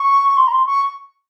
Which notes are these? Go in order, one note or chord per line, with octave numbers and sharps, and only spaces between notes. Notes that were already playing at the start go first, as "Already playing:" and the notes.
Already playing: C#6
C6
A#5
C6
C#6